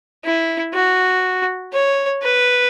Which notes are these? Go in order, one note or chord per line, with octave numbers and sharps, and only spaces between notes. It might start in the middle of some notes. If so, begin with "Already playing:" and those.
E4
F#4
C#5
B4